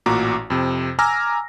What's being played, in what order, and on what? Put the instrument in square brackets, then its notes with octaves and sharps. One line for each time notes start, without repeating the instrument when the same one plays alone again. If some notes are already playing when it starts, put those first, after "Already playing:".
[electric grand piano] A1 A#2 F#4 A#5 D6
F2 C3
G#5 A#5 D6 E6 F6 A#6